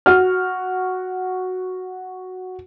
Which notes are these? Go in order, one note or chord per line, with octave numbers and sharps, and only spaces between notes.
F#4 F6